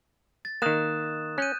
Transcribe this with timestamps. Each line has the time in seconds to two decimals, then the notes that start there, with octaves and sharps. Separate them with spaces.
0.45 A6
0.62 D#3 A#3 D#6 F#6 E7
1.38 C#4 F#6 G6 D#7